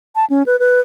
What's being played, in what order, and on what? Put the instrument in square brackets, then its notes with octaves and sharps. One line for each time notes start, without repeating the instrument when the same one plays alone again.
[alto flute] A5
C#4
B4
B4